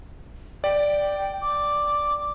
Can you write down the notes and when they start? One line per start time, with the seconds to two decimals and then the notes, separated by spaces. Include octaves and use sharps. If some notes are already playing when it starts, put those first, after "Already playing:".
0.64 D5 G5
1.41 D6